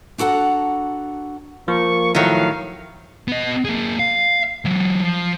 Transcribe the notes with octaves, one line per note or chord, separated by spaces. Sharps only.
D4 F#4 A4 F#5 A#5
F3 A#3 C#6
A2 D#3 F#3 F5
B3 D#5
A#3 G#4
F5
E3 F#3
F3